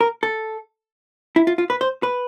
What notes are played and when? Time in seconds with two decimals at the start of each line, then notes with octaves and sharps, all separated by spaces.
0.01 A#4
0.23 A4
1.36 E4
1.47 F4
1.58 F4
1.70 B4
1.81 C5
2.03 B4